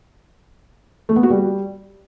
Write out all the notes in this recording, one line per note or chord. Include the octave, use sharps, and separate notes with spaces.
A3
B3
F#4
G3